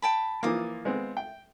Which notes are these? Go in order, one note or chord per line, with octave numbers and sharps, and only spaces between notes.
G5 A5 B5
E3 F3 A#3 F4 D6 D#6
G#3 B3 C4
G5